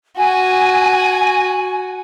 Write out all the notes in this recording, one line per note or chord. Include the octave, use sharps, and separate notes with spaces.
F#4 G#5